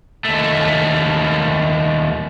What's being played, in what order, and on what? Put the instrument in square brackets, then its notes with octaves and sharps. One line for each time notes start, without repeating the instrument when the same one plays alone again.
[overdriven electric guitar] D#2 A3